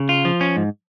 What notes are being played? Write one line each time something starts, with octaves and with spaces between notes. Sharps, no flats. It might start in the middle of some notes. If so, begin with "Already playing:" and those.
Already playing: C#3
F4
F3
C#4
G#2